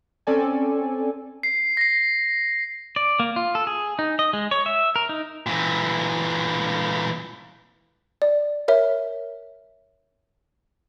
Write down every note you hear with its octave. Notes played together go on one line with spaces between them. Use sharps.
C4 C#4 A4 D5 G#5
C7
A#6 C7
D5
A#3
F4
A4
G#4
D#4
D#5
G#3
C#5
E5
A#4
D#4
A#2 E3
D5
A#4 C#5 E5